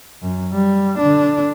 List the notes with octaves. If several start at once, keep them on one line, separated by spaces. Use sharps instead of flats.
F#2
G3
D3 D4